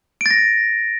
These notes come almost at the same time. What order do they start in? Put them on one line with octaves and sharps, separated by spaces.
D7 A6 A#6